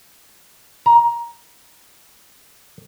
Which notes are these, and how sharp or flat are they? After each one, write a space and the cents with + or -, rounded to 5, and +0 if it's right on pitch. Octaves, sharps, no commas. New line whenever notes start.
A#5 +15